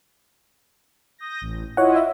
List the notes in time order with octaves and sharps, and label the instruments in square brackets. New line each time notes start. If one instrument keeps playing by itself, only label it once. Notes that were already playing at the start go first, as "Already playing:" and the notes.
[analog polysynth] D#6 G6 A#6
A1
[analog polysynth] E4 F4 D#5 [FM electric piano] C#5 F#5
[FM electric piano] E5